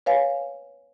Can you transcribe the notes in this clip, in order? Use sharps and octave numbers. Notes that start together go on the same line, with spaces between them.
B4 C#5 F5 G#5